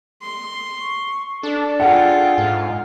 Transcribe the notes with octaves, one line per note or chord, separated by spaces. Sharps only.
C6
C#6
D4 A4
F4 G#4 A4 F#5 G5
G#2 F6